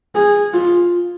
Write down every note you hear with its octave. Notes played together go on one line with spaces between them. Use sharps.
G#4
F4